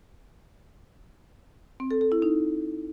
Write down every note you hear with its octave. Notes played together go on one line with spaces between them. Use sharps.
C4
A4
A4
E4
D#4